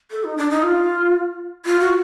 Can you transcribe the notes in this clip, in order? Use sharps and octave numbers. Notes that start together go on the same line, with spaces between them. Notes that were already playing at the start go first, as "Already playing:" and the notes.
A4
D#4
D4
D#4
F4
F4
F#4